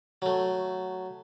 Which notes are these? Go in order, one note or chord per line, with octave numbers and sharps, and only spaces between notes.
F#3 A3